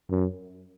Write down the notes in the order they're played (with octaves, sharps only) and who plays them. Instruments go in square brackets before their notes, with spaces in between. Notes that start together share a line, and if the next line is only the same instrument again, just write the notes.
[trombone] F#2